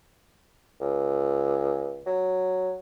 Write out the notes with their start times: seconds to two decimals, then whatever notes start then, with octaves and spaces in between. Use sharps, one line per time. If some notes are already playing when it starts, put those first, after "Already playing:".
0.81 C#2
2.07 F#3